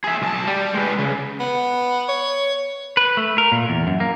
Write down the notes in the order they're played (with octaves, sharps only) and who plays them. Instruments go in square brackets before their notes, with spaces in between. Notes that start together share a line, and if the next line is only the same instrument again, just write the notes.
[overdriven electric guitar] G#4 E5
B1 A5
G3
G#3 B4
C#3
[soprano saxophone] B3
C#5
[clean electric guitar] B4
A3
A#4
A#2
E2
F#2
A#3